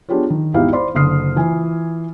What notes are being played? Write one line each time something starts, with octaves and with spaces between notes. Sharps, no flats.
B3 D4 F4 G4 G#4 C#5
D#3
G#1 E2 D#4 E4 G4 F5
C5 D5 B5 C6
F#1 D3 C6 D#6 F6 C7
E3 F4 G#5